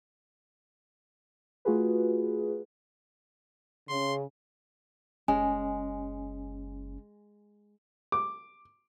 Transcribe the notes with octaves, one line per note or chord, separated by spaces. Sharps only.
A3 F4 F#4 G#4 B4
C#3 C6
F#1 G#3 C#4 G#5
D6